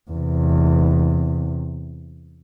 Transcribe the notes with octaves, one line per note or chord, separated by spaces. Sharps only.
E2 C3